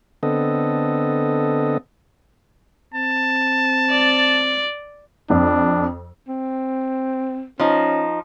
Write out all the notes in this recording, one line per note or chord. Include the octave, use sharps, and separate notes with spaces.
D3 B3 C4 A4 D#5
C4 A5
D5
F2 D4
C4
F3 C#4 D#4